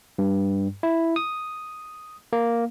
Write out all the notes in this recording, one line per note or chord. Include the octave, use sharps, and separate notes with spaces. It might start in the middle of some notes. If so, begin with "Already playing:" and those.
G2
E4
D#6
A#3